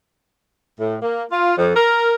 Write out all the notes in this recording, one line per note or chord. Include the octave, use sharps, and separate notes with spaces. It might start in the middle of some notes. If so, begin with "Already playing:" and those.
A2
A#3
F4
F2
A#4